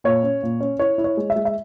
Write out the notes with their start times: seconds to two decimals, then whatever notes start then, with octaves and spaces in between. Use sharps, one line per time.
0.04 A#2 C#5
0.23 C#4
0.43 A#2
0.60 C#4
0.79 E4 C#5
0.98 E4
1.04 C#5
1.17 G#3
1.30 E5
1.36 G#3
1.45 E5